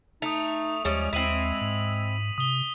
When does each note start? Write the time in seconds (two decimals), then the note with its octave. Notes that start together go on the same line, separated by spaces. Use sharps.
0.22 A3 D#4 D#6 F7
0.85 D#2 F3 G3 G#3 C#4
1.13 D#2 C4 E4 B6 D#7 F#7
1.61 G#2
2.38 C3 D#6 G7